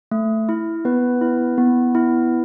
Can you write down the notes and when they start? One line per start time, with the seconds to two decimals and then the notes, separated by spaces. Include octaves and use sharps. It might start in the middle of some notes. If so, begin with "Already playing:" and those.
0.11 A3
0.49 E4
0.85 B3 B4
1.21 E4
1.58 B3
1.95 E4